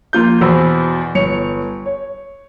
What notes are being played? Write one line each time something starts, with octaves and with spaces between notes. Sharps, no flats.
A#1 A#3 F4 G6
E2 B2 F#4 C5 B5 E6
G1 C#5 C#7 F7
C#5